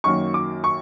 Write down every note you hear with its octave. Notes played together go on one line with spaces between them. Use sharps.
F#2 D#3 F#3 A#3 C#6
D6
C#6